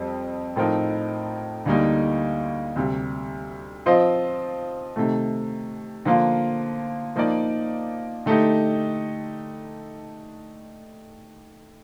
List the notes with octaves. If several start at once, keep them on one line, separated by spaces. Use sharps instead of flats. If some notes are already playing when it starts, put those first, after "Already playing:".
Already playing: F2 G3 C4
A2 F3 C4 D#4 A#4
D2 D3 G3 A#3 D#4
D2 C3 G3
F3 C4 F4 C5 D#5
C3 D#3 A3
D3 F3 A#3 F4
F3 A#3 D#4 A#4 D5
D3 A3 D#4 G4